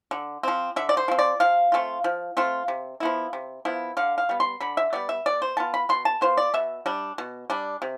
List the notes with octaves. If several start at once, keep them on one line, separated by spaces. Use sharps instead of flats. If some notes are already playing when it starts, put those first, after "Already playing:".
D3
F3 C4
D3 E5
D5
C5
F3 C4
D5
F3 F5
A3 C4 F4
F3
A3 C4 F4
C3
F3 B3 E4
C3
F3 B3 E4
D3 F5
F5
G3 B3
C6
D3 B5
E5
G3 B3 D5
E5
B2 D5
C5
B3 F4 A5
B5
B2 C6
A5
B3 F4 C5
D5
B2 E5
G3 D4
B2
G3 D4
C3